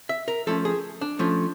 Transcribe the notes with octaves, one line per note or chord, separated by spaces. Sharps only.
E5
A#4
F3 A3 C#4 A4
G#4
D4
F3 A3 C#4